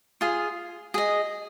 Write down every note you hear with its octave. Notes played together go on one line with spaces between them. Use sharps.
F4 G#4
G#4 D#5